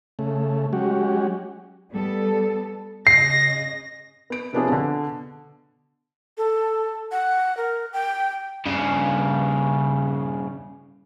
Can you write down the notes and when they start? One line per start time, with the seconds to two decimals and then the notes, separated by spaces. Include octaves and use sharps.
0.19 C#3 A3
0.73 F#3 G#3 C#4 F#4 G4
1.91 G3 B3 A4
3.07 C#3 D#5 A#6 C7
4.30 B3 D7
4.53 C3 F3 B3 C#4 D4 G#4
4.68 B2 D3
6.38 A4
7.12 F#5
7.57 A#4
7.93 G5
8.66 G2 C#3